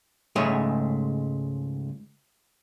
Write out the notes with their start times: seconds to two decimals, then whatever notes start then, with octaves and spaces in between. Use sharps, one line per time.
0.36 C#2 G#2 G#3 A3 G#4 C#5